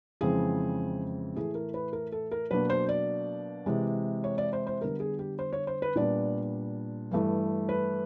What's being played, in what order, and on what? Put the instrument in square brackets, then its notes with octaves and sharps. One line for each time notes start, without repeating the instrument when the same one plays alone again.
[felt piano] F2 C#3 E3 G#3 C4 G#4
A2 E3 A3 G#4
A#4
B4
A#4
A4
A#4
B2 F#3 A#3 D4 B4
C5
D5
C3 E3 G#3
C#5
D5
C5
C5
D3 G3 B3 A#4
G#4
G4
C5
C#5
C5
B4
A#2 G3 B3 D4 D5
G2 E3 A3
B4